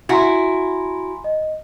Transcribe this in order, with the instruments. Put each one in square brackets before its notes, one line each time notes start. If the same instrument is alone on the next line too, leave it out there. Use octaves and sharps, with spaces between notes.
[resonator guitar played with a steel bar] E4 F#4 [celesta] G#5 A#5 C6
[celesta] D#5